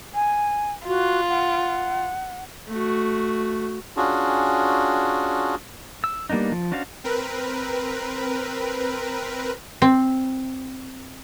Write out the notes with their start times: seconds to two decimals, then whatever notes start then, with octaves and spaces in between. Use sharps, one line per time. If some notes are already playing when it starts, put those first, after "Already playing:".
0.15 G#5
0.87 F4 F#4
1.29 F#5
2.68 A3 F#4
3.97 C#4 D4 F4 F#4 G#4
6.04 E6
6.30 G3 A#3 B3 D4 D#4
6.52 F3
6.72 C#4 D4 F#4 C5 F5
7.04 C4 A#4 B4
9.82 C4